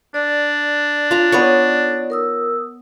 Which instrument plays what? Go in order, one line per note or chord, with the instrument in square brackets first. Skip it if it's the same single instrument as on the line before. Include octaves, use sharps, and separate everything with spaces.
[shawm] D4 [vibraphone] D5
[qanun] F4 A#5
[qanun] B3 C#5 C#6 [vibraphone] D#4 A4 D5
[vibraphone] A#4 D#6 E6